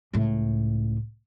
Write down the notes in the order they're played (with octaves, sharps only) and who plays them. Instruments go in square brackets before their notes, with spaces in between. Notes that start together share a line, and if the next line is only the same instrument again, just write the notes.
[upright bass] C#2 A2